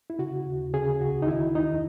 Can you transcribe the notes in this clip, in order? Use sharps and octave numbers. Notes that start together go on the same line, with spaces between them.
E4
C#3 F#4
D#2
C#3 G#4
C#2 F#4
D#4
D#3 E4
E2 D#4